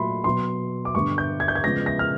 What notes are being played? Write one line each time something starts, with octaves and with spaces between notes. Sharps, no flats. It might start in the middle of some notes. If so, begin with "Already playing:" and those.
Already playing: A#2 F#3 A3 B5 C6
B2 F#3 B3 C6
D6
G2 D3 G3 B3 C#6
G6
G#6
G6
G#6
C#3 F3 G#3 B3 A#6
A#6
F6